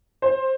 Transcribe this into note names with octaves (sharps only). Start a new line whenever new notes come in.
C5